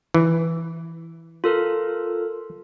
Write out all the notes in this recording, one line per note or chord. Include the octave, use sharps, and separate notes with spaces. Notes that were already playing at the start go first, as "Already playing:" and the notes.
E3
F4 A4 A#4